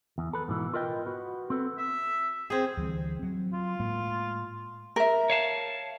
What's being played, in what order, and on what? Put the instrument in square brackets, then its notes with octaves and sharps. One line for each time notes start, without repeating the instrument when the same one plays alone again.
[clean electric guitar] E2
A4 B4
G#2 B2 E3
F4 A#4 B4 D#5 G5
B3 F#4
C4 A4 B4
[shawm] E5
[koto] C4 G#4
[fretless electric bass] D2 E3 G3
F#3 C4
[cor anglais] F4
[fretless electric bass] A2 G#3 A#3
[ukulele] A#4 E5
[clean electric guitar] C#5 F5 A5